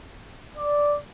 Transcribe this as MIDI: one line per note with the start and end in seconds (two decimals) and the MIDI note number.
0.57 0.94 74